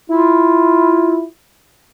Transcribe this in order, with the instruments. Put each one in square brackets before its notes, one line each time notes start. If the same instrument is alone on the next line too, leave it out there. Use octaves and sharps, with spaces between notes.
[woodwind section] E4 F4